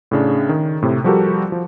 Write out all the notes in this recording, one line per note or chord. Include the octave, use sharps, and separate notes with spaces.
A2 C#3 D4
D#3
A2 C3
F3 G3 F#4 G4 A4 A#4
F3